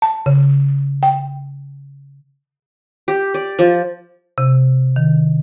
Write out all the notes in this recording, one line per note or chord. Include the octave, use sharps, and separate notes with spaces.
A5
C#3
G5
G4
D5
F3
C3
D#3